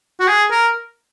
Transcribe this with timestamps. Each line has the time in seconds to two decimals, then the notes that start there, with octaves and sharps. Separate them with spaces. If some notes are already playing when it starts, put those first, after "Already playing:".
0.20 F#4
0.28 G#4
0.51 A#4